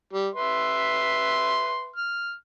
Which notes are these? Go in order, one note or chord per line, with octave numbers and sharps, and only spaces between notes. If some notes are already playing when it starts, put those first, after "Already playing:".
G3
B4 E5 C6
F6